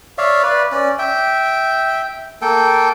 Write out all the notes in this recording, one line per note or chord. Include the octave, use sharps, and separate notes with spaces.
C#5 D5 E5 F5
B4 D5
C#4 D5
E5 G5
A#3 A4 G5